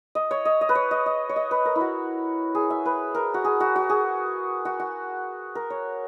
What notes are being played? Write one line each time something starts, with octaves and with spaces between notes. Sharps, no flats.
D#5
C#5
D#5
D#5
B4
C#5
D#5
D#5
C#5
D#5
B4
A#4
E4
F#4
G#4
E5
B4
A#4
F#4
G#4
F#4
F#4
G#4
F#4
F#4
A#4
C#5